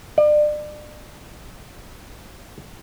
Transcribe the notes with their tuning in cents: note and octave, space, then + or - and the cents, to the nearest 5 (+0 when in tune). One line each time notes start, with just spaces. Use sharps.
D5 +35